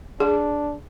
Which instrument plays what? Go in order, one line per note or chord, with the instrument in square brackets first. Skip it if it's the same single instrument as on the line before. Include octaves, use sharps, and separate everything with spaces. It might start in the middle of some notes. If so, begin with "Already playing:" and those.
[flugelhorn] D4 [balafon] G#4